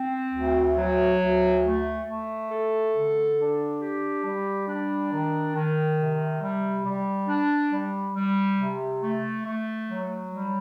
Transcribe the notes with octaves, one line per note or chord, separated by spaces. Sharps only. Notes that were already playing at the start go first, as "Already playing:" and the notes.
Already playing: C4
D2
F#3
D2
A3
A3
A4
D3
D4
G4
G3
D4
D#3
D#3
C3
G3
G3
D4
G3
G3
C3
A3
A3
F#3
G3